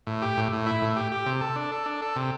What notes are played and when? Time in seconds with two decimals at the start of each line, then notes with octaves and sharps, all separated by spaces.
0.07 A2
0.22 G4
0.37 A2
0.52 A2
0.66 E4
0.82 A2
0.96 G4
1.12 G4
1.26 C3
1.41 A4
1.56 D4
1.72 A4
1.86 D4
2.02 A4
2.16 C3